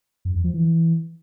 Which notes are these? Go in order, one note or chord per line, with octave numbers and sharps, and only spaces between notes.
F#2
E2
F3
E3